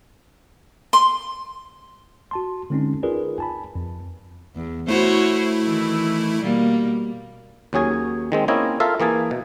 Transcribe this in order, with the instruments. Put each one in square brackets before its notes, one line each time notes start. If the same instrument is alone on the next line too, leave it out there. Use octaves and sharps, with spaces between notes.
[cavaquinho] C6
[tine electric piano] F#4 A5 C6
D3 G#3 C4 C#4 D#4
D#4 F4 G#4 A#4 B4 D5
G#5 A5 B5
F2
[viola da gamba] E2
[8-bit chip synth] A3 E4 [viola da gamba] F#4 C5 C#5
[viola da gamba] D#3 E3
B2 G3 A#3
[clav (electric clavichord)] D#2 F#3 C#4 G#4 G#5
D#3 G#3 C4
A#3 C4 C#4 E4 D#5 G#5
F4 A4 A#4 E5 F5
E3 A#3 G#4 G#5 A5
B2